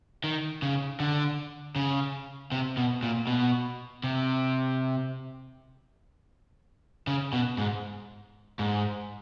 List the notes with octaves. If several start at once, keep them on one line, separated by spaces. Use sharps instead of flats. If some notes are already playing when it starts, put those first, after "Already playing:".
D#3
C#3
D3
C#3
C3
B2
A#2
B2
C3
C#3
B2
G#2
G#2